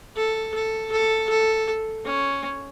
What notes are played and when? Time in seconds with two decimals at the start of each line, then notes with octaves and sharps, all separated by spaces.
0.17 A4
0.54 A4
0.92 A4
1.30 A4
2.05 C#4